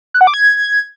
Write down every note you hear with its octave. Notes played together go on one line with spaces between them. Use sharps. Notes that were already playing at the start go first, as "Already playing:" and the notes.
F#6
F#5
D6
G#6